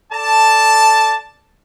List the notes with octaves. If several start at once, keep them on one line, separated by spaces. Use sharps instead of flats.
A4 D5 A5